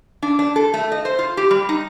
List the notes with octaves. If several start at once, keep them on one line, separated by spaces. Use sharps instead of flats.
D4
D4
A4
A3
D#5
C5
F4
G4
G3
D#4